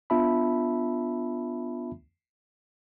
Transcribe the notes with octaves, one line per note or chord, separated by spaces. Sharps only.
B3 D4 F4 E5 A5 B5